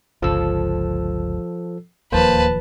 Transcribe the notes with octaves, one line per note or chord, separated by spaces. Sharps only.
G1 C#2 F3 A4 E6
D1 D#2 F3 A#3 B4 C5 A5